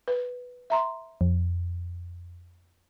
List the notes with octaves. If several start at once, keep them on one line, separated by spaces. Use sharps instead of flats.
B4
E5 A#5 C6
F2